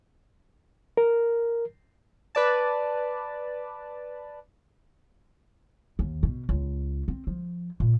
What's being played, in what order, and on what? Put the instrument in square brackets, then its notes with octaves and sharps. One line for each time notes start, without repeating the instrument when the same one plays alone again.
[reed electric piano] A#4
[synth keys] B4 D5 A5
[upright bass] D#2
B2
C#2
C4
F3
A#2